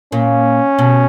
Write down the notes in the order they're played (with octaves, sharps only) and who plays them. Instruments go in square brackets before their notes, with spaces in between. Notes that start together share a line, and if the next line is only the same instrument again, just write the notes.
[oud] A#2 [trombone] C#4
[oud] B2